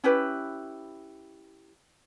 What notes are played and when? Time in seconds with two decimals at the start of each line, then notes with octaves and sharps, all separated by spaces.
0.04 C#4 E4 G4 B4